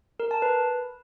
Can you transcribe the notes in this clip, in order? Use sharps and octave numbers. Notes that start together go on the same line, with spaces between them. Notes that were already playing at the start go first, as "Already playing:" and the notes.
A#4
A5
B4